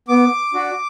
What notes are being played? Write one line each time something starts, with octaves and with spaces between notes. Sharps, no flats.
B3 D6
D4 F#4